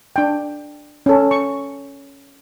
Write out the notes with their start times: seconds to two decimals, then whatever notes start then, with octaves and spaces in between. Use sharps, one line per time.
0.16 D4 G5
1.06 C#4 A4
1.31 C#6